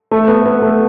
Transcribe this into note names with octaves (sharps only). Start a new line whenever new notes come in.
A3
B3
B3
A3